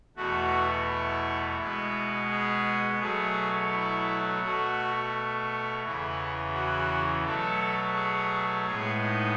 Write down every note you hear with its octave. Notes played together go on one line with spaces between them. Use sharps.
E2 B2 A3 F#4
E4
B2 G#3 B3 E4
G#4
B2 F#3 A3 G#4
E4
B2 A3 F#4
E2 C#3 E3 E4
F#4
B2 F#3 A3 A4
G#4
A2 G#3 B3 G#4
D#4